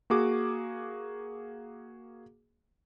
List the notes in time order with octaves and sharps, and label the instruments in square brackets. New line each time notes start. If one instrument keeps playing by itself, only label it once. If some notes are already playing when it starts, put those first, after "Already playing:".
[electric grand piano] A#3 F#4 G#4 D6